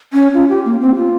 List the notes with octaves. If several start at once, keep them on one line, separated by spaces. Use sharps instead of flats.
C#4
F4
G4
A#3
C4
F4